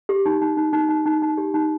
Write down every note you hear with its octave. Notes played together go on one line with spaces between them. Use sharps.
G4
D#4
D#4
D#4
D#4
D#4
D#4
D#4
G4
D#4